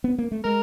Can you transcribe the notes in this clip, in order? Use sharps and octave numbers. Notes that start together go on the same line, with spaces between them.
B3
A#3
A3
G#3 A#4